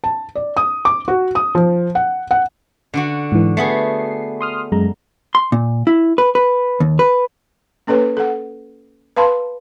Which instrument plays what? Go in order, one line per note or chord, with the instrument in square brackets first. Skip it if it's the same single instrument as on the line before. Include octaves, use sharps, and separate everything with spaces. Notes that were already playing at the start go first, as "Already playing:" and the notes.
[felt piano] A5
D5
D#6
D6
F#4
D#6
F3
F#5
F#5
[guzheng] D3 D4 F#4
[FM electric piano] G#2 E3
[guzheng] A3 B3 G#4 [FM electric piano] C7
[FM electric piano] C6 D#6 F6
F#2 G#3 A#5
[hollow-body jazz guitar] C6
A#2
E4
B4
B4
D#2
B4
[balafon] A#3 C#4 A4 B4 C#5
A4 F#5
B4 F5 A5 B5 C6